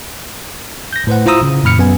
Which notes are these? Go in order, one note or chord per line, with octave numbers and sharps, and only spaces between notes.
G6 A#6
A2 B4 C5 F#5
E4 F4 C5 A#5 D#6 E6
C#3
F#2 A#2 B5 F6 C#7
F#2 B3 G#5